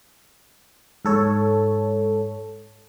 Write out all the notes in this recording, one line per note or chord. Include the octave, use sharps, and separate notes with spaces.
G#2 A4 C#5